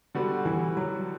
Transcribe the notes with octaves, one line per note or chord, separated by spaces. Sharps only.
D3 G3 B3 F#4
E3
F#3